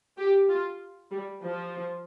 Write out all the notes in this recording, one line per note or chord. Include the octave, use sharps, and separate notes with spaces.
G4
F4
G3
F3